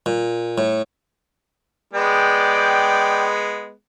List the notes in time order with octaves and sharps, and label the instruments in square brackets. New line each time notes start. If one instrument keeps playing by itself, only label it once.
[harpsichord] A#2
A2
[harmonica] G#3 B3 [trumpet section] D5 G5